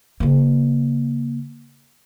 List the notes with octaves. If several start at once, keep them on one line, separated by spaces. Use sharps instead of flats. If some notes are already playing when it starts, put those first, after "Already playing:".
C#3 A#3